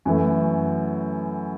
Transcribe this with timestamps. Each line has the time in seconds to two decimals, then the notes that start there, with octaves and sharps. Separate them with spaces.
0.05 F#2 E3 A3